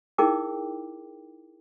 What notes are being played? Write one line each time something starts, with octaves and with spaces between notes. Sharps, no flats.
D#4 E4 G#4 A#4 G5 D6